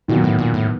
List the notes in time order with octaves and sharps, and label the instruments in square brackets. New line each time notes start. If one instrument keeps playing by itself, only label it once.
[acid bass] A#2 [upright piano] D#3 F#3 B3
[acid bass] A2
A#2
A2